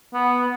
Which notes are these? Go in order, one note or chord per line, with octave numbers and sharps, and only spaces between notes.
B3